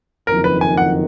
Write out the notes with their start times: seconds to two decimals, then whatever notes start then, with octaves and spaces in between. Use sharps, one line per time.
0.27 F#1 F2 D#3 A#4
0.44 B4
0.61 G#5
0.77 F#5